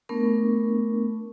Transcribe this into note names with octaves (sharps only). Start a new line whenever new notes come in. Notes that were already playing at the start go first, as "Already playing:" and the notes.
A3 B3 D4 A#4 C#6